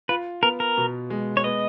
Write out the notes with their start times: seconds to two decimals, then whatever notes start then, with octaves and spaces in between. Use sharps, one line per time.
0.09 F4 B4
0.43 B3 A#4
0.60 A#4
0.77 B2
1.10 G#3
1.37 C#5
1.44 B3 D#5